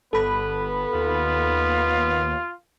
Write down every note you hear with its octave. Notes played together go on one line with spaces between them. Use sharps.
G1 B3 A4 B4 B5
D#2 F4